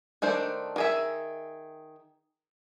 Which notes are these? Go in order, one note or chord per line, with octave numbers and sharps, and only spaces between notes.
D#3 A3 D4 C5
D#3 G#4 E5